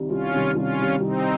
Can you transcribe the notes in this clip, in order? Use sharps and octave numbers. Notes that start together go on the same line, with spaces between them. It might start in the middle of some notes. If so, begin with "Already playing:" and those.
Already playing: C2 C3 D#3 G3
C2 C#4 F4
C3 D#3 G3
C2 C#4 F4
C3 D#3 G3
C2 C4 D#4